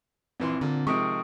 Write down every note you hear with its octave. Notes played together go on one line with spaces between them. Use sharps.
A#1 E3 C4 C6
A#2 D3
C3 D#3 F3 G#3 C#6 D#6 D7